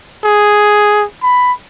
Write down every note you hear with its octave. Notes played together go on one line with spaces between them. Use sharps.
G#4
B5